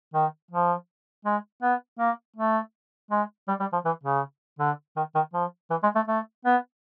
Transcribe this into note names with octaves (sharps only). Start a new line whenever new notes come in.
D#3
F3
G#3
B3
A#3
A3
G#3
G3
G3
F3
E3
C#3
D3
D#3
D#3
F3
E3
G#3
A3
A3
B3